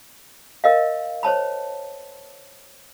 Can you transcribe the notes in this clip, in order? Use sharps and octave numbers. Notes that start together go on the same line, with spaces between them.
A#4 D#5 F5
C5 C#5 A5 B5